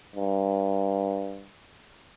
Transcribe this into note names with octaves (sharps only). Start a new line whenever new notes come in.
G2